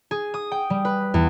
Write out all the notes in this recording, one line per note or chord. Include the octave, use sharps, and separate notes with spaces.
G#4
D#6
G5
G3
B4
E2